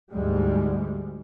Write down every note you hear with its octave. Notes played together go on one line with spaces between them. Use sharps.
D2 G#2 G3 G#3